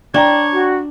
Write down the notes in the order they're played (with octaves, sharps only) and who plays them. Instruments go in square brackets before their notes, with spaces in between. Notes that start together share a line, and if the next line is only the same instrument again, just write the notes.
[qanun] D4 [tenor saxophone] C#5 [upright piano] D5 G5 A#5
[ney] F#4